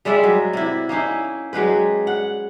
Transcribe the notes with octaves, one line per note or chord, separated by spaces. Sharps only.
G3 G#3 D5 E5
F#3
C3 E4
A#3 C#4 D#4 E4
F#3 G#3 G4 B4
F#5